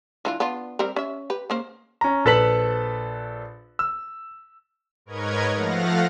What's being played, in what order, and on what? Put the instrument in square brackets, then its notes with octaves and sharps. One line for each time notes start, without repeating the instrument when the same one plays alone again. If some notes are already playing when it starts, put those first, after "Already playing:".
[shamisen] E3 D4 F4
B3 D4 F4
G3 C4 A#4
C#4 E5
G4 B4
C#3 A#3 C5
[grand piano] C#4 A#5
A#1 A4 B4 A5 B6 F#7
E6
[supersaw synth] G#2 A#4 B4 C#5 D#5 G#6
F3 A3 F5 F#5 A#6